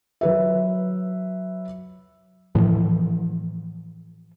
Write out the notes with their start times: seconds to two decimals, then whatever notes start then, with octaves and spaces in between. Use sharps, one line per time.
0.21 F#3 B4 E5
2.55 A2 E3 F3